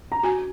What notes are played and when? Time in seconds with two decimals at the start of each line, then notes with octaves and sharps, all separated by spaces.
0.12 A#5
0.23 F#4 G#5